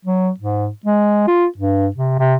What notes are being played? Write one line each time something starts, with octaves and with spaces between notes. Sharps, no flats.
F#3
G#2
G#3
F4
G2
C3
C3